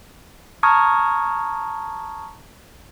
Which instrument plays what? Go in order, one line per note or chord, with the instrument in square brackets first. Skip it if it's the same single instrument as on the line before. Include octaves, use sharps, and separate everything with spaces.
[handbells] A5 A#5 C#6 D#6 F6 G#6